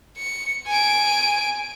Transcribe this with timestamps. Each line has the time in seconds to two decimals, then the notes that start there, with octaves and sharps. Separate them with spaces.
0.18 C#7
0.67 G#5 D7